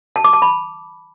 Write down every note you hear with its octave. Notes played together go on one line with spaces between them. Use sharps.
A5
D6
A5
B5